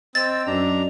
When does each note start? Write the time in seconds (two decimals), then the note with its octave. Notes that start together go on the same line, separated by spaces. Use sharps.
0.15 C4 D#5 E6 A6
0.47 F#2 D4 A#5